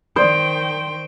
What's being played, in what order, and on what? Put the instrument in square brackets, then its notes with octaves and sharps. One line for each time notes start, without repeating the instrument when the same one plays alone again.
[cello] D#3 G5 [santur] C5 [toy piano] D5 D#6